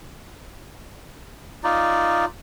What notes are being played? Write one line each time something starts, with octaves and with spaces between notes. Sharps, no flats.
D#4 F4 D5